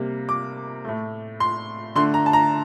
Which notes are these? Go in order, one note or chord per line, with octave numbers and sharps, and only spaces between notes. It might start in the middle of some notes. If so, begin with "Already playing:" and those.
Already playing: C3 G3 A#3
D6
A2 A3
C6
D3 A3 C6
A#5
A5
A#5